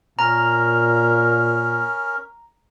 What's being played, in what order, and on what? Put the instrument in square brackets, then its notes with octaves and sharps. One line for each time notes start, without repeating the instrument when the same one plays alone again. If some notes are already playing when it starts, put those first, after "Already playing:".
[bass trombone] A#2 [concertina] C#4 A#4 [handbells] A#5